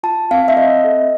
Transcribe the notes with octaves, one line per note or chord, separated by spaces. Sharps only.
F4 A5
C4 F5
E5
C4 D#5
A4